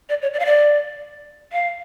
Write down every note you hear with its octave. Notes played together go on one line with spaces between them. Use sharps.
D5
C#5
D5
F5
D5
F5